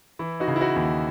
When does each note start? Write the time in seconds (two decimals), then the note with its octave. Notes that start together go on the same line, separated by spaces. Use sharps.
0.19 E3 E4
0.40 D#4 F#4
0.48 C#3
0.56 E4
0.61 D#4 F#4
0.76 D#2